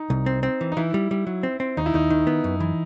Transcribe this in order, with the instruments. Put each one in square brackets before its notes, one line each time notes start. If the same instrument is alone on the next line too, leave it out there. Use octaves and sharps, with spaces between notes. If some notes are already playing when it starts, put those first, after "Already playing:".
Already playing: [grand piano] D#4
[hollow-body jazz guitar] C2
C4
C4
E3
[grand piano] D#4
[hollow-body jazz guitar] E3 [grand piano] E4
[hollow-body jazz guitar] G3
G3
F#3
C4
C4
[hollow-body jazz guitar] D#2 [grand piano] D#4
[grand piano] E4
[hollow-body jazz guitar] D#2 [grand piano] D#4
[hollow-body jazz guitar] D#3
B3
F#2
E3